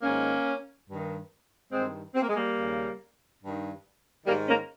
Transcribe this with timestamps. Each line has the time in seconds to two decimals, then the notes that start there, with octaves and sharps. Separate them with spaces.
0.03 G#2 D#3 A#3 C#4
0.88 G2 D#3
1.72 G2 D#3 G#3 C4
2.15 C4
2.22 A#3
2.29 G#3
2.36 G3 A#3
2.56 D#2 C#3
3.42 G2 D#3
4.26 G#2 D#3 G3 A#3
4.48 A#3 C#4